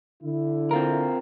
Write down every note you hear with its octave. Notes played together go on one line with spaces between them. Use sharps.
D3 E4
C4 F4 A#4